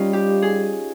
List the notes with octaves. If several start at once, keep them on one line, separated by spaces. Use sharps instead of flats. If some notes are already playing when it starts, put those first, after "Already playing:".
Already playing: G3 C#4 D#4 F4
G4
G#4